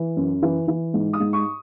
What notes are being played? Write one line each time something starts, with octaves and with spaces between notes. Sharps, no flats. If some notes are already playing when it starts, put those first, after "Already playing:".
Already playing: E3
F#2
E3
E3
G#2
D#6
G#2
C#6